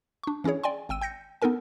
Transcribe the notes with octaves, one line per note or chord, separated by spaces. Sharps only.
D4 C#6
E3 C#4 E4 G#4 C#5
D5 G5 G#5 C6
G#1 G5 E6 D#7
G5 G6 A#6 C#7
B3 D#4 A4 A#4 G#5